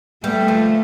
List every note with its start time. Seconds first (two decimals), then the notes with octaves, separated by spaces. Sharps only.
0.24 G3 A3 B3
0.48 D3 F3